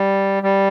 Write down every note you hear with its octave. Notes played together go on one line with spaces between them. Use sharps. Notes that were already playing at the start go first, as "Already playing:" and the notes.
Already playing: G3
G3